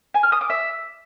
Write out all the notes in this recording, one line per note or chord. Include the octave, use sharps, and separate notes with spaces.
G#5
F6
D#6
D6
E5